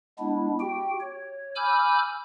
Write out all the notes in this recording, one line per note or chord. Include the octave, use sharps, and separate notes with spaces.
G#3 B3 D4 E4
F#4 G4 G5
C#5
G#5 B5 D6 E6 F6 G6